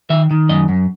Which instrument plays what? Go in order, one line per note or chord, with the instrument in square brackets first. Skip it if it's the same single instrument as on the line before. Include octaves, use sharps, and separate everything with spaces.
[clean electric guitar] D#3 E5
D#3
F#2 D#5
F#2